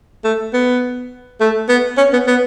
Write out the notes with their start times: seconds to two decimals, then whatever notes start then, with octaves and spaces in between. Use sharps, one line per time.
0.24 A3
0.54 B3
1.41 A3
1.69 B3
1.98 C#4
2.13 B3
2.27 B3